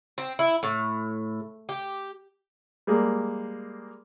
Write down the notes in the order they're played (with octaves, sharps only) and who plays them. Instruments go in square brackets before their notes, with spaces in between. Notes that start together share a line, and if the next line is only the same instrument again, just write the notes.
[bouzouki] C4
E4
A2
G4
[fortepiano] G3 G#3 A#3